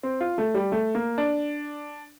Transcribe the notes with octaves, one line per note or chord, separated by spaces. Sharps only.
C4
F4
A3
G3
A3
A#3
D4